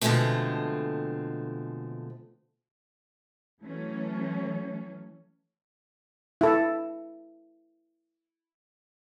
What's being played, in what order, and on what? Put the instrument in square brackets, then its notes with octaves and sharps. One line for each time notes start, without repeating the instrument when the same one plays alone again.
[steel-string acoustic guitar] B2 D3 F3 G#3 A3 C4
[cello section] E3 F#3 A3 C#4
[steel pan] E4 A4